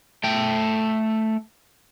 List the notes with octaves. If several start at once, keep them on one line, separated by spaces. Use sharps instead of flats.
A3 G5